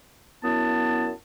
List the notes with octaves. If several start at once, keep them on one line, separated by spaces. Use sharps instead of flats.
F#2 B3 E4 A5